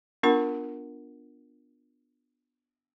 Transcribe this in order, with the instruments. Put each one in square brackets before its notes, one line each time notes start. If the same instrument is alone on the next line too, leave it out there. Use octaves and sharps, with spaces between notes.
[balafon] B3 D4 F4 A#4 F#5 B5